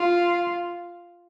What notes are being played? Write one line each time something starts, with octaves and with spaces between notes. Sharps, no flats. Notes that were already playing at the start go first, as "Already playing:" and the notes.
Already playing: F4